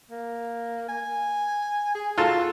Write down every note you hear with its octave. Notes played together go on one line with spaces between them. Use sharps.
A#3
G#5
G#4
F4 F#4 A4